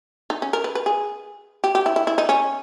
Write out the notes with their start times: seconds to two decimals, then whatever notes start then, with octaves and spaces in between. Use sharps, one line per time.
0.30 D#4
0.42 C#4
0.53 A#4
0.64 B4
0.75 B4
0.86 G#4
1.64 G4
1.75 G4
1.86 E4
1.96 E4
2.07 E4
2.18 D#4
2.29 C#4